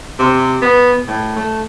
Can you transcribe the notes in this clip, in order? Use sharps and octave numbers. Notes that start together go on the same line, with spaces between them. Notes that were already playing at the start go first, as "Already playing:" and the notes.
C3
B3
A2
A3